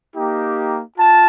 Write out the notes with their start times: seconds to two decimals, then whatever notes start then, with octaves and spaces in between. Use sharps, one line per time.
0.15 A#3 D#4 G4
0.98 F4 A5